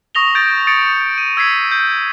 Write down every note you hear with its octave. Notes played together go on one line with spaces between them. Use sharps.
C#6 D#6 A#6 F7 G7
G6 A6 D7
D#6 A6 C#7 D7
D#7
E6 G#6 B6 C7
G6